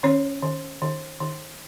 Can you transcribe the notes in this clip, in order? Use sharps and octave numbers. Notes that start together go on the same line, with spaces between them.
D#3 C#4 C#5
D#3
D#3
D#3